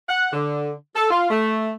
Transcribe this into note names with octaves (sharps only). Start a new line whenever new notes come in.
F#5
D3
A4
F4
A3